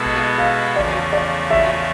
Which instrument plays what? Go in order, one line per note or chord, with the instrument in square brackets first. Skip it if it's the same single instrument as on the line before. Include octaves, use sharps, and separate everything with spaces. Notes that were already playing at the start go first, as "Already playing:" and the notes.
Already playing: [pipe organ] B2 G#3 B3 E4 A4
[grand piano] F5
[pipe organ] E2 C#3 F3 A3 [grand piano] D5
[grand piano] D5
E5